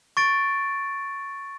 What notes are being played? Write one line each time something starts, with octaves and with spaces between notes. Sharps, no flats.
C#6 A6 D7